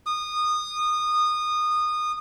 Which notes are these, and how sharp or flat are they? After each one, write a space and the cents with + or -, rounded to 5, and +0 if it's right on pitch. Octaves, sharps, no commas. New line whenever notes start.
D#6 -20